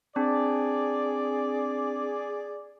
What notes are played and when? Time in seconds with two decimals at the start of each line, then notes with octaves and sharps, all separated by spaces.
0.16 C4 D4 G#4 D5